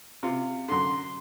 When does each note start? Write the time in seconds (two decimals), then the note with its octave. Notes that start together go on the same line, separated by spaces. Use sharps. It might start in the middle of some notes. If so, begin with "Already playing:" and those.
0.23 C3 F4
0.68 F#2 D3 C6